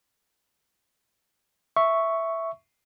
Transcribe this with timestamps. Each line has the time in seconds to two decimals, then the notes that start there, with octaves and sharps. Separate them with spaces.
1.76 E5 C#6